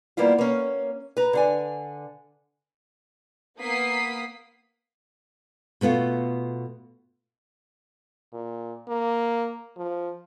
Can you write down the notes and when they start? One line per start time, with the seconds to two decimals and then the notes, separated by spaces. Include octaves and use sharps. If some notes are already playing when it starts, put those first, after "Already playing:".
0.17 G3 A#3 B3 E4 F4
0.38 A#3 C#4
1.17 B4 A#5
1.33 D3 D4 G#5
3.59 A#3 B3 D#6 B6 C7
5.81 B2 A3 B3 F4
8.33 A#2
8.88 A#3
9.77 F3